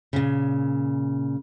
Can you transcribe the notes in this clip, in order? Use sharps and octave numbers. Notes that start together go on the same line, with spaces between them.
A#2 C#3